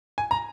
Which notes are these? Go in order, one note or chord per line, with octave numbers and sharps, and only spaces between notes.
G#5
A#5